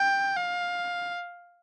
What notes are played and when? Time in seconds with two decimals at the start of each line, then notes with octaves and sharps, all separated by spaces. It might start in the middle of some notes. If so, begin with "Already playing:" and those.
Already playing: G5
0.37 F5